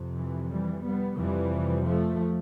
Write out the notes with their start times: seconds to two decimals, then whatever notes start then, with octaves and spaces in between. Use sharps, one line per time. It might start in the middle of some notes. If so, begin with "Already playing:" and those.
Already playing: F2 C3
0.13 E3
0.47 E3 G3
0.82 G3 B3
1.16 F2 C3 E3 G3
1.85 F3 A3